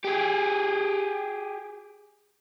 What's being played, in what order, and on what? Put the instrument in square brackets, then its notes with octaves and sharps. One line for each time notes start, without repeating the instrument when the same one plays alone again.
[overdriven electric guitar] G4 G#4